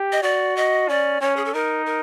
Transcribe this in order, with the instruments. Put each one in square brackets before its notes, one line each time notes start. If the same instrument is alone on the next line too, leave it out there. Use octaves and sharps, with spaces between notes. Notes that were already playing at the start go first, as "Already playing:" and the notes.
Already playing: [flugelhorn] G4
[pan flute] D#5
[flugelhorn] F#4 [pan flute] D5
[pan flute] D#5
[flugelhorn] C#4 [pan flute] D5
[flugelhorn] C#4 [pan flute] C#5
[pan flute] G#4
A4
[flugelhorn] D#4 [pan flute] A#4
[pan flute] A#4